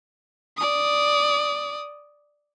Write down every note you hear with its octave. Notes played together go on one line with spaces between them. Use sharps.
D5 D#6